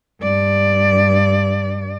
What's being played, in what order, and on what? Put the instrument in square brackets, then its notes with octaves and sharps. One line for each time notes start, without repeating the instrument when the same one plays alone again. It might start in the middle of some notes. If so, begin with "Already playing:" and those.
[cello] G2 D5